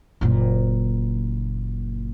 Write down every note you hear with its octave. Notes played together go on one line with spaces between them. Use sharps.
F#1 A#2